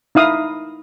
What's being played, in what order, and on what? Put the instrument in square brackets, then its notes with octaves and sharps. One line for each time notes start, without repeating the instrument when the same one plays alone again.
[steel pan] D#4 E4 F5 D#6